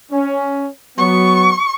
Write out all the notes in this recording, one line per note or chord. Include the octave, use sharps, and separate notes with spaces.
C#4
F#3 B3 C#6